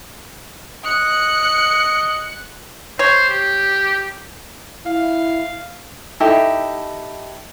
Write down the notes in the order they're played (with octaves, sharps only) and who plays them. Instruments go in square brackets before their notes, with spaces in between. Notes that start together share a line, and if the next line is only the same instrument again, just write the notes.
[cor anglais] D#5 [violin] F#6 C#7
[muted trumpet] C5 [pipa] C#5
[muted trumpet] G4
[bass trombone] E4 [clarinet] F5
[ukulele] D#4 E4 G4 A4